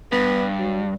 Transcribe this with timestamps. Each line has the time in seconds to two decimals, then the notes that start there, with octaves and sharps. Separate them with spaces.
0.12 G2 B3
0.58 F#3